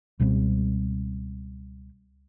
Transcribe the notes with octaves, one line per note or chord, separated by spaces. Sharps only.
C#2 B2 G3 C4